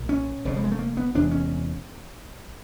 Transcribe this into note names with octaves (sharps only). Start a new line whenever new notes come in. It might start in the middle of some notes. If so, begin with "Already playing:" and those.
Already playing: B1 A#2
C#4
F1 F2 C#3
G3
G#3
A3
A#3
B3
E1 E2 C3 D4
C#4